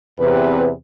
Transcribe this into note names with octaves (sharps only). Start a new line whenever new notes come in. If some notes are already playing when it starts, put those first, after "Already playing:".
E2 C3 B4